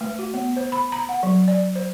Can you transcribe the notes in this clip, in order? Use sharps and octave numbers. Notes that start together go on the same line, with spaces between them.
A3
F#4
B3
C5
B5
A#5
F#5
F#3
D5
C5